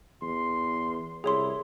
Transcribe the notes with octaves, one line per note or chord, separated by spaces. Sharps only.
E2 C6
C2 E4 G#4 C#5 C6